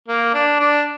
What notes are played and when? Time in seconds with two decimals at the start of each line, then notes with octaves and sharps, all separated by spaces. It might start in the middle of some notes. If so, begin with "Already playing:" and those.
0.08 A#3
0.34 D4
0.59 D4